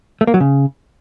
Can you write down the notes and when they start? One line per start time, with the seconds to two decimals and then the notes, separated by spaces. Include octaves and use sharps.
0.21 A3
0.27 A#3
0.34 F#3
0.40 C#3